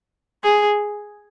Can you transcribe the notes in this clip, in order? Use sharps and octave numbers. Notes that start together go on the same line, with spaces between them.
G#4